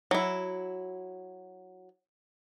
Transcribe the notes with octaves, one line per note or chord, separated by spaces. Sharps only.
F#3 E4